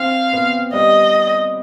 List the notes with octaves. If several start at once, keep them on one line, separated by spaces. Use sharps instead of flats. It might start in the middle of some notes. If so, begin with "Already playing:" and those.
Already playing: C4 F5
B3
G3 D#5